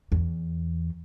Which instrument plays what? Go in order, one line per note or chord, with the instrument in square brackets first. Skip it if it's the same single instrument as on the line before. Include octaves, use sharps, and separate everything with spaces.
[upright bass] E2